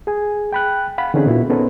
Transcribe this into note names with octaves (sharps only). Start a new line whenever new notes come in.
G#4 G#5
G5 B5 F#6
F5 F#5 B5
D3 E3 C4 C#4 D#4 G#4
A#2 B3 E4 F#4
B3 C#4 D#4 A4 B4 C5